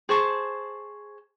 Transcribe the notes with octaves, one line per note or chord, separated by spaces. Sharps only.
G#4 C5 A5 C#6